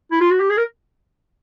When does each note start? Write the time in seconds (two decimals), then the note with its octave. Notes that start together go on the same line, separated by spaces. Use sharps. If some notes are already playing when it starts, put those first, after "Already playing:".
0.11 E4
0.21 F4
0.31 F#4
0.40 G4
0.50 G#4
0.57 A#4